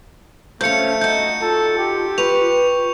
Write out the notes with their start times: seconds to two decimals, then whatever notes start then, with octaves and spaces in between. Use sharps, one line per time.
0.61 F3 A3 C#4 G6 C#7
1.01 D#4 F#4 D#5 G6
1.41 F4 A4
1.78 G4
2.18 B4 C#6 F7